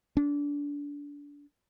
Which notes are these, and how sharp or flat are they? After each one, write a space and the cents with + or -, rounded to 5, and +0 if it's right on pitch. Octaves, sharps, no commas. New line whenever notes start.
D4 -25